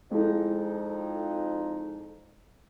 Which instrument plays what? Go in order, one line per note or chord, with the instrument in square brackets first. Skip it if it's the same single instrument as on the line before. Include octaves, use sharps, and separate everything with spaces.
[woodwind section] F2 D#4 [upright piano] G#3 E4 A4